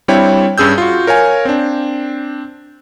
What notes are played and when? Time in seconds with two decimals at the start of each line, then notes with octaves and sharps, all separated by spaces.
0.08 G3 C4 D4 E4 C#5 G5
0.58 G2 C#4 G#4 E6 G6
0.78 F4 F#4
1.07 A#4 C#5 F5 G#5
1.45 C4 D4